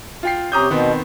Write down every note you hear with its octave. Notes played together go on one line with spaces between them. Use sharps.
F4 G5 C7
C3 C#4 G4 A#5 D#6 G6
B2 D#3 B3 C4